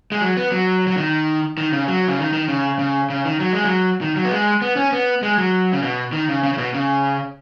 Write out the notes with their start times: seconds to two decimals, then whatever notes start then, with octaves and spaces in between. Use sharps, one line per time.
0.12 G#3
0.21 F#3
0.37 B3
0.52 F#3
0.87 F#3
0.97 D#3
1.58 D#3
1.72 C#3
1.88 F#3
2.07 C#3
2.19 D#3
2.33 D#3
2.48 C#3
2.79 C#3
3.10 C#3
3.25 D#3
3.40 F#3
3.53 G#3
3.65 F#3
4.01 D#3
4.16 F#3
4.25 B3
4.32 G#3
4.62 B3
4.76 C#4
4.92 B3
5.23 G#3
5.38 F#3
5.73 C#3
5.82 B2
6.13 D#3
6.29 C#3
6.43 C#3
6.53 C#3
6.58 B2
6.74 C#3